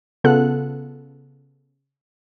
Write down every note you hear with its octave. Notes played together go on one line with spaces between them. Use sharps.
C#3 B3 F4 A4 F#5 F#6